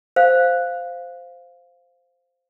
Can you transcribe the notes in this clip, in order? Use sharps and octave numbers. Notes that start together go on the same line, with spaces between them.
C5 F5